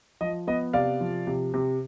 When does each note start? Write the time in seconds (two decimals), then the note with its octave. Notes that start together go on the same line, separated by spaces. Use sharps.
0.21 F3 D#5
0.47 B3 D#5
0.73 C3 D5 F5
1.00 F3
1.27 C3
1.54 C3